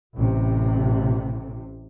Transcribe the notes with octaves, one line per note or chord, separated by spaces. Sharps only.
A1 C3